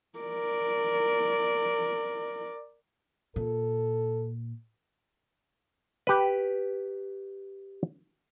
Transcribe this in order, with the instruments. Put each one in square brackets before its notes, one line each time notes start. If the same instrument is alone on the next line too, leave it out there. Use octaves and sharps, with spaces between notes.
[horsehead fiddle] A#4 D5
[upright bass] A#2 [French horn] A4
[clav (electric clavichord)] G4 B4